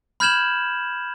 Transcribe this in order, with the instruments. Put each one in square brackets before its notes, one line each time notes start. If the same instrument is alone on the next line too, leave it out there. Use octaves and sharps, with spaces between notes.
[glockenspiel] B5 F6 G6 G#6 E7 F#7